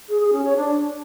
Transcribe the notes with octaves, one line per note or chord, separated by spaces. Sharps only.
G#4
G#4
C#4
C#5
D4